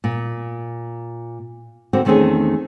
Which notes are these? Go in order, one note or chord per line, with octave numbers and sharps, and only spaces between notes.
A#2
D3 A#3 C4 F#4
E2 D#3 A3 C4 C#4 G#4